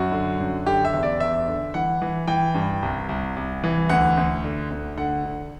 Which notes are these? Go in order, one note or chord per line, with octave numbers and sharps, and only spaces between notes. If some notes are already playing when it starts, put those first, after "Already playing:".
Already playing: F#2 F#4
D3
F#2
D3 G4
E5
E2
D5
E2 E5
D3
E3 F#5
E3
E3 G5
G2
C2
C2
C2
E3
D2 F#5
D2
D3
D2
D3 F#5
D3